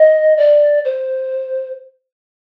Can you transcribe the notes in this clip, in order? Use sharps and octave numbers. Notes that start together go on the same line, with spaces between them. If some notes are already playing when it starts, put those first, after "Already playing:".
Already playing: D#5
D5
C5